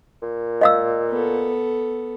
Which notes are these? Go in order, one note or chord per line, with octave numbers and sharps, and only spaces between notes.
A#2
D#5 F5 E6
B3 A4